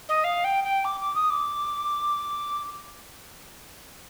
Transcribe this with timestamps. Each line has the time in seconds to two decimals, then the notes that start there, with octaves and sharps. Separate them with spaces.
0.08 D#5
0.24 F5
0.44 G5
0.63 G5
0.84 D6
1.00 D6
1.15 D#6
1.30 D6